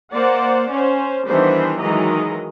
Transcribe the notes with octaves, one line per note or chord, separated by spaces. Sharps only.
A#3 C5 D5 F#5
C#4 C5
D#3 E3 G3 B3 D4 C5
D#3 E3 F#3 G#3 D#5 A#5